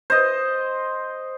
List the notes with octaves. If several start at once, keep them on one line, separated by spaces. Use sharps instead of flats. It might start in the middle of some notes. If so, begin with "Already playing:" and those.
C5 D#5